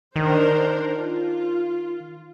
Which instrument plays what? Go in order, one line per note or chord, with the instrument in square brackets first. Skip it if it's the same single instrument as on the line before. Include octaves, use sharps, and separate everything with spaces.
[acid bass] D#3 [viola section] D4 A#4 C5
[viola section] F4